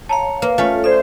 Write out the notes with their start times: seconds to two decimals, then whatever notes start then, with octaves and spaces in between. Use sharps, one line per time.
0.09 C#5 F5 A5 A#5
0.42 A#3 B4
0.58 A3 C#4 F4 A4 C#5
0.84 A4 C5 D5 E5